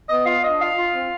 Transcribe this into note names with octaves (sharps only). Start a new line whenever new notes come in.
B3 D#5
F4 F5
D4 D#5
F4 F5
F4
C4